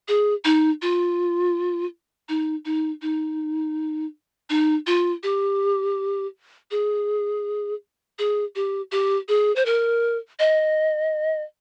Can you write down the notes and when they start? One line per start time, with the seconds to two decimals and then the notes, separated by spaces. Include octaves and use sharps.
0.08 G#4
0.45 D#4
0.82 F4
2.29 D#4
2.65 D#4
3.02 D#4
4.50 D#4
4.87 F4
5.23 G4
6.71 G#4
8.19 G#4
8.55 G4
8.92 G4
9.28 G#4
9.56 C5
9.66 A#4
10.39 D#5